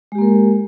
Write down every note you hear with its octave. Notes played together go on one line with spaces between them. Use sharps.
G#3 A#3 G4 A#4